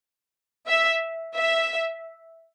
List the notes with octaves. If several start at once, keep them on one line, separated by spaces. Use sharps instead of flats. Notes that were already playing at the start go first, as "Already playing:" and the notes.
E5
E5